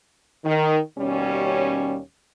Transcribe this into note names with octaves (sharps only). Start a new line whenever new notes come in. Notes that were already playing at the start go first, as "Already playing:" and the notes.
D#3
D#2 B2 G3 C#4